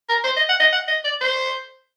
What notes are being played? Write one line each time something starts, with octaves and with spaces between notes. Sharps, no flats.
A#4
C5
D#5
F#5
D#5
F#5
D#5
D5
C5